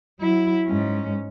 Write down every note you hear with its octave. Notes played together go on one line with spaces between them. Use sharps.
F#3 E4
G#2 C#4